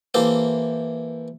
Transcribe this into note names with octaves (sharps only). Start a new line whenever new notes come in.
E3 A#3 E4 G4 A4 C5